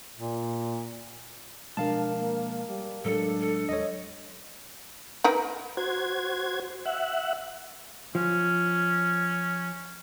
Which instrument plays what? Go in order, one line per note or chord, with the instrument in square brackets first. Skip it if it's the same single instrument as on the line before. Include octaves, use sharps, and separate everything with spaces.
[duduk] A#2
[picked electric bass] B2 F3 G#3 [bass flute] D4 [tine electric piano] A#4 F5 A5
[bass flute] A#3
G3
[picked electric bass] A2 F#3 G#3 [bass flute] D4 [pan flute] A4
[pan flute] A4
[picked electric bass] D#2 F#3 G#3 [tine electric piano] C#5 D#5
[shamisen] D#4 A#4 B4
[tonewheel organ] F#4 C5 G#6
E5 F#5
[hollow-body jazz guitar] F3 [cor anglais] C#4